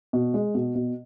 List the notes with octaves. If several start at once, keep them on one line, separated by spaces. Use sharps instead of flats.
B2
G#3
B2
B2